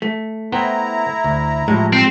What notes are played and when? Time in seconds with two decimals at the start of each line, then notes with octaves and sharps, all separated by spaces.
0.02 A3
0.52 B3 E4 C5 G5 A#5
1.24 D2
1.68 A2 F3 G3 G#3
1.93 C4